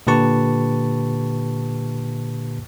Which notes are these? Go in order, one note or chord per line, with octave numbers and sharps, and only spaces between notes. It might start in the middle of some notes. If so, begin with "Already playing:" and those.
A#2 D3 G4 B4 A5 C#6